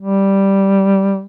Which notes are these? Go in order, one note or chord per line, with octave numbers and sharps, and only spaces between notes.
G3